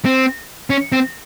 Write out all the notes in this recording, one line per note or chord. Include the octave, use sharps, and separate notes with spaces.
C4
C#4
C4